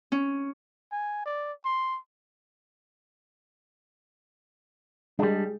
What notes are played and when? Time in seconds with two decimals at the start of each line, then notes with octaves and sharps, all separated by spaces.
0.12 C#4
0.92 G#5
1.26 D5
1.65 C6
5.19 G3 G#3 D4